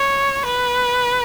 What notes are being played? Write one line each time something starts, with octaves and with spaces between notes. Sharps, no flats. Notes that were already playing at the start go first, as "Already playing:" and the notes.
Already playing: C#5
B4